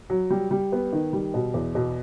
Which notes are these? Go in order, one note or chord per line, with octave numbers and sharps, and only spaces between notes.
F#3
G3
G3
B3
D#3
G3
B2
E2
B2